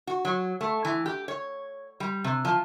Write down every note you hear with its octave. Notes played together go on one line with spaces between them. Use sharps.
F#4
F#3
A3
E3
G4
C#5
G3
C3
F3